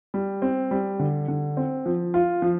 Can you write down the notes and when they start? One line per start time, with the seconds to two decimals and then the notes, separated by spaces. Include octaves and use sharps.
0.14 G3
0.42 C4
0.71 G3
0.99 D3
1.28 D3
1.57 C4
1.86 F3
2.14 F4
2.42 F3